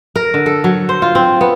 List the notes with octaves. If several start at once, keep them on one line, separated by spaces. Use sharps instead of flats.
A#4
D3
A4
F#3
C5
F4
C4
B3